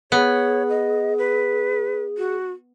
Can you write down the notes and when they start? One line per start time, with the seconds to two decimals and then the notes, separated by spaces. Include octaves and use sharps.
0.12 B3 G#4 C#5
0.69 D#5
1.18 B4
2.18 F#4